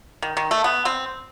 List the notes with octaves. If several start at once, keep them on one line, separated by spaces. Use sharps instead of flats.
D#3
D#3
A3
B3
C4